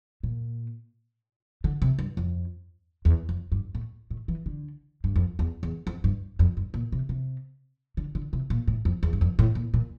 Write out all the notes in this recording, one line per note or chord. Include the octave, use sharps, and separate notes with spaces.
A#2
D3
C3
G2
F2
E2
F2
G2
A2
A2
E3
D3
G2
F2
E2
E2
F2
G2
F2
G2
A#2
C3
C3
D3
D3
C3
A#2
A2
F2
E2
G2
F2
A2
A#2
A#2